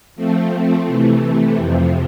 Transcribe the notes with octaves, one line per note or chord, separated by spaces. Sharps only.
F3 A3 C4
C3 E3 A3
F2 C3 F3